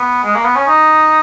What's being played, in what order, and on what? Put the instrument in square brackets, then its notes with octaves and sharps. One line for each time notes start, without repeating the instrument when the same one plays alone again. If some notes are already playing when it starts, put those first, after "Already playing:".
Already playing: [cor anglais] B3
G#3
A#3
B3
C#4
D#4